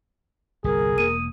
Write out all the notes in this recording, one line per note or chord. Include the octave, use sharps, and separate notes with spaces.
G1 C2 A#2 G#4 A#4
E1 A#3 D#6 D#7